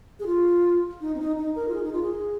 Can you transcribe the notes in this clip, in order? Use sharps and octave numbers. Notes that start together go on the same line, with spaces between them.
G#4
F4
D#4
C4
D#4
D#4
A#4
F4
G#4
D#4
F4
G#4